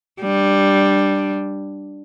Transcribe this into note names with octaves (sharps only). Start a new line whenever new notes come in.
G3 D4